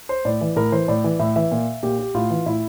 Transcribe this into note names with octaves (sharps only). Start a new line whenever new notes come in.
C5
A2 D5
E3
A2 A#4
E3 C5
A2 D5
E3
A2 E5
E3 E5
A#2
A#2 G4
G4
A2 F4
E3
A2 E4